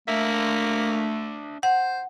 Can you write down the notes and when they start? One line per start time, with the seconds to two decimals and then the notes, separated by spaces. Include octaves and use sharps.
0.08 A3 A#3 D4 E5
1.63 C5 F#5